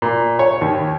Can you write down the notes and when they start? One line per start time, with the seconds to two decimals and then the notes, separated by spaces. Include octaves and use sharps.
0.02 A#2
0.39 C#5
0.61 D#2